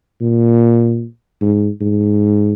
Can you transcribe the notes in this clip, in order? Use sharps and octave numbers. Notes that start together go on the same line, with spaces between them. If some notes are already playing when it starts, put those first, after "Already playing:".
A#2
G#2
G#2